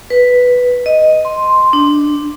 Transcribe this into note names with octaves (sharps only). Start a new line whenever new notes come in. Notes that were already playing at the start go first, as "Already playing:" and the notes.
B4
D#5
C6
D4